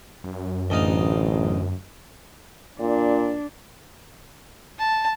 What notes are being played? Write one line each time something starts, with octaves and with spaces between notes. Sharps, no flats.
F#2
A1 D2 D#4 F5
A#2 D4
A5